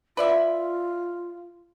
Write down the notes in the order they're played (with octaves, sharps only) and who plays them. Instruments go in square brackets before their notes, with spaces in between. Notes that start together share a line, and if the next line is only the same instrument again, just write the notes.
[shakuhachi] F4 [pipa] B4 D5 E5